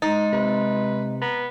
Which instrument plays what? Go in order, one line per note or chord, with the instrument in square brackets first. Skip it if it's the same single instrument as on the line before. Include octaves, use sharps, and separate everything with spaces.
[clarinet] G#3 [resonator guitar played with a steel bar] D#4 [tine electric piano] A6
[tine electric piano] C3 [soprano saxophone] B4
[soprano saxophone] B3 [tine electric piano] A#5